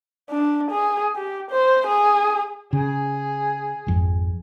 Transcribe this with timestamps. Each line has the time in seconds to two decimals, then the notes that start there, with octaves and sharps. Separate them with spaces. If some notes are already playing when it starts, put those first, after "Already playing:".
0.30 D4
0.71 G#4
1.16 G4
1.51 C5
1.86 G#4
2.73 C#3 G#4
3.87 G#1 F2